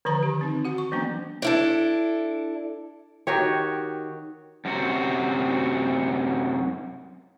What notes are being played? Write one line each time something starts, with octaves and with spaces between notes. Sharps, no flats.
D3 D#3 F3 B4 A#5
G4
C4 D#4
F#4 F#5
C#6
E3 F#3 A#3 B3 C#4 D4
D4 E4 A4
D#3 F#4 G4 C#5
F#2 C3 F#4